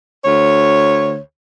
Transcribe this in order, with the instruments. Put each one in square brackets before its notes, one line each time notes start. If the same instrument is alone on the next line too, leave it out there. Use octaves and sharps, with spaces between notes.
[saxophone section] D2 C#5